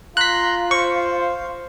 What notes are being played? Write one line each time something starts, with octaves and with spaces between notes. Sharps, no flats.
F4 A#5 C6 F#6 B6
C5 F5 C#6